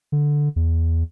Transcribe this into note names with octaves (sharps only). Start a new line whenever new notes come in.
D3
E2